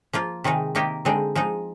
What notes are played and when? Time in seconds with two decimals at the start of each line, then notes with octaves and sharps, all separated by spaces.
0.13 F3 A#3 F4
0.44 C3 D#3 G#3 D#4
0.75 C3 D#3 A#3 D#4 G4
1.05 D3 G#3 C4 D#4
1.35 F3 G#3 D#4